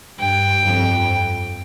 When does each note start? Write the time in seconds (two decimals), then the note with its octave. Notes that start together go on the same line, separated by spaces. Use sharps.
0.19 G2 G5
0.65 F2